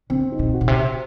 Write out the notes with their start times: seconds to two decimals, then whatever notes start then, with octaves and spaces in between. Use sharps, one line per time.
0.10 D3 C4
0.32 D#4
0.39 A#2
0.54 F#4
0.61 A#2
0.68 C3